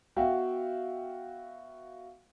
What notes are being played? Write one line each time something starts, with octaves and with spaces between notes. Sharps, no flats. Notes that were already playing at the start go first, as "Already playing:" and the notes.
B3 F#4 E5 F5 G5